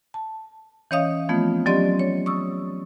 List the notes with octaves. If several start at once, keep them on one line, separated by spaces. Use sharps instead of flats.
A5
E3 C#4 C#5 D#5 F5 D#6
E3 F3 A3 B3 C4 F4
F#3 C#4 G4 D5 D#5 C6
C#5
C#6 D#6 E6